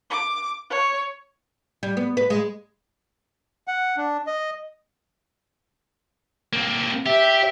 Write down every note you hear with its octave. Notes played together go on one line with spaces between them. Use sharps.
D6
C#5
G3
B3
B4
G#3
F#5
D4
D#5
A#3 C4
G4 E5